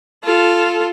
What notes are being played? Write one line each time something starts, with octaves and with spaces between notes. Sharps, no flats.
F4 A4